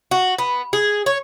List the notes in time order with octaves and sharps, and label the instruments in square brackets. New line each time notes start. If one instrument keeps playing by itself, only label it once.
[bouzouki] F#4
B3
G#4
C#5